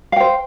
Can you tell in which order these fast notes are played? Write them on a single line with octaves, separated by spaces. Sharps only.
F5 G5 C5